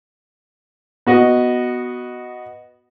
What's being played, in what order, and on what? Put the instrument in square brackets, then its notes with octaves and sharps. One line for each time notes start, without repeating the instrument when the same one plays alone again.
[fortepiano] B3 F#4 D#5